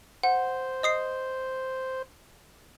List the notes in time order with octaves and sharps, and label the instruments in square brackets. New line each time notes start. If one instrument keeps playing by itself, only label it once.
[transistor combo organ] C5 [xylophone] F#5
[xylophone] D#5 D#6 C7